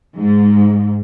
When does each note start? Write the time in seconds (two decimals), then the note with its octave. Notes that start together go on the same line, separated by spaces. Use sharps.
0.17 G#2